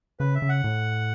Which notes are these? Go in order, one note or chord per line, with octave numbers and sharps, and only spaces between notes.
C#3 B4
E5
C#3
F#5
A2